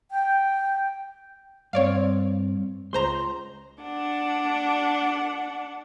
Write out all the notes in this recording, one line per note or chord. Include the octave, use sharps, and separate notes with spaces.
G5
G2 C4 C#5 D5 F5
C#2 C5 A#5 C6
D4 F#5